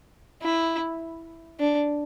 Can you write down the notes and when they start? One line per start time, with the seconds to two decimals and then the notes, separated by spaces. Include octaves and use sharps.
0.42 E4
1.59 D4